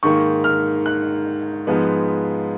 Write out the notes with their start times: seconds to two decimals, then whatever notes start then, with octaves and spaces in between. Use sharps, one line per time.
0.03 G#2 D#3 A#3 C#6
0.44 F6
0.86 F#6
1.67 G#2 F3 G#3 B3